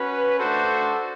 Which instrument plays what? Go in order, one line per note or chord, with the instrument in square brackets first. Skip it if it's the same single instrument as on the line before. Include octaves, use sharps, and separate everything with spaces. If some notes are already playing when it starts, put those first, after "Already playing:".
Already playing: [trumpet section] C#4 F#4 B4
A3 D4 F#4 A4 C5